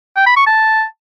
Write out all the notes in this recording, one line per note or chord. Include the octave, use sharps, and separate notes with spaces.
G5
B5
C#6
A5